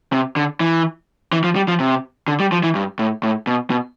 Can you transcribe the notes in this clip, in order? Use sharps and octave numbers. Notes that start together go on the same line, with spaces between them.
C3
D3
E3
E3
F3
G3
F3
C3
D3
G3
F3
E3
G2
A2
A2
B2
B2